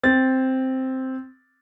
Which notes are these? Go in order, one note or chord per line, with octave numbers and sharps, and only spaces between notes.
C4 A6